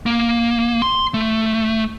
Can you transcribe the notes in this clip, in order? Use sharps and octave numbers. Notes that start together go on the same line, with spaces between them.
A#3
C6
A3